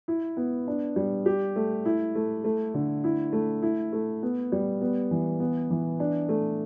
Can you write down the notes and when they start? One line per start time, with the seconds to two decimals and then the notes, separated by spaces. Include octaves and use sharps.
0.08 E4
0.37 B3
0.68 D4
0.96 G3
1.26 G4
1.56 A3
1.85 E4
2.15 A3
2.44 A3
2.74 D3
3.04 E4
3.33 A3
3.63 E4
3.93 A3
4.22 B3
4.52 G3
4.81 B3
5.11 E3
5.40 B3
5.70 E3
6.00 D4
6.29 A3